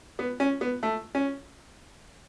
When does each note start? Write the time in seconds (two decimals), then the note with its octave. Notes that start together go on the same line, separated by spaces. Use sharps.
0.19 B3
0.40 C#4
0.61 B3
0.83 A3
1.15 C#4